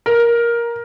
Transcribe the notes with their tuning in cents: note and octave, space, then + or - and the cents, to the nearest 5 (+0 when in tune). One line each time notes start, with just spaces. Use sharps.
A#4 +10